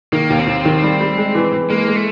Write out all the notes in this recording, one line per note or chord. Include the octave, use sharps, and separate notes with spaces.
D#3 A#3
D#2
C4
D#2
D#3
G3
G3
G#3
E3
E3
G#3 A#3
G#3
A3